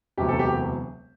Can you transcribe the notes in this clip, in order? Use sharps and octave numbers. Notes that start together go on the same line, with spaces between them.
E1 D2 C3 F#3 G4
A4
G4